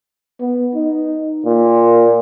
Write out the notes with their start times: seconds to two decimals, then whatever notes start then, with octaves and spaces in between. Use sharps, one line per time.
0.40 B3
0.75 D#4
1.45 A#2